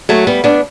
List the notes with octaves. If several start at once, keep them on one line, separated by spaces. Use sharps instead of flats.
F#3 A3
G3 B3
B3 D4